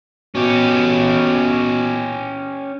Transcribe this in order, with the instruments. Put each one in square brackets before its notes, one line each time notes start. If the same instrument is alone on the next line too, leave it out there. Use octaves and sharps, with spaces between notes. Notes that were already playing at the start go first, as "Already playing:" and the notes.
[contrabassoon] B2 [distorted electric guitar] C#4 G4